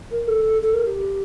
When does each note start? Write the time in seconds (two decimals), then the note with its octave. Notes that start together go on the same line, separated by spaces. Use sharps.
0.11 A#4
0.27 A4
0.62 A4
0.73 A#4
0.85 G4